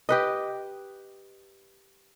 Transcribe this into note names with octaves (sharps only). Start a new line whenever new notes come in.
G4 B4 D#5